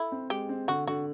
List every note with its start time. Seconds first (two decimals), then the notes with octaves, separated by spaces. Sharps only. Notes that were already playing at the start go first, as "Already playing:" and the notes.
Already playing: E4 A4
0.12 C4
0.30 G#3 G4
0.49 C4
0.68 D3 F#4
0.87 D3 F#4